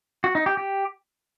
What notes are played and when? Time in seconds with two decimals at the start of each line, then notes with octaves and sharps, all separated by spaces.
0.24 F#4
0.35 D#4
0.46 G4
0.57 G4